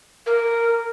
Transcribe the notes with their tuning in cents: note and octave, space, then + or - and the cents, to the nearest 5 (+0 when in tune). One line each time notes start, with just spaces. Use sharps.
A#4 -10